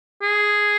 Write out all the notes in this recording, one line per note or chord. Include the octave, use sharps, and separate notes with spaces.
G#4